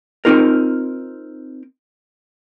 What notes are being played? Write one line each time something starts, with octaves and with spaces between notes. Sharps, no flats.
C4 C#4 D#4 F4 A#4